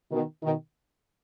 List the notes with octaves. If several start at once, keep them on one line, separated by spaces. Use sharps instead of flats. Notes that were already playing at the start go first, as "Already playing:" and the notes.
B2 D#3
B2 D#3